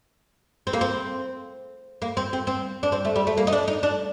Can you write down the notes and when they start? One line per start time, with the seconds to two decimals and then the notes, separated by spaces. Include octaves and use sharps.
0.67 C4
0.73 A#3
0.81 C4
2.02 A#3
2.17 C4
2.33 C4
2.47 C4
2.83 D4
2.92 C4
3.05 A3
3.15 G3
3.27 A3
3.37 A#3
3.47 D#4
3.52 D4
3.68 D#4
3.83 D4